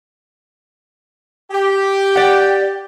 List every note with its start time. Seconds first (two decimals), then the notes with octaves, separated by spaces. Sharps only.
1.51 G4
2.16 D5 F#5